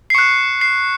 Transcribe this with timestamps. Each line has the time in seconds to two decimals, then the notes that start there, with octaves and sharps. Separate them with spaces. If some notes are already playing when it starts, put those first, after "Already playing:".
0.10 C7
0.14 C#6 F#6 C#7
0.61 C7